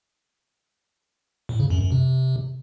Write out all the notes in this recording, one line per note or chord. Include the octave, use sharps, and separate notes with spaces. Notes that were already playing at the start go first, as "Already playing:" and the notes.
A2
C#3
F#2
F#2
C3